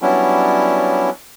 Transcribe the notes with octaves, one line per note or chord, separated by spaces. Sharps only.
F#3 G3 B3 C#4 D4 E4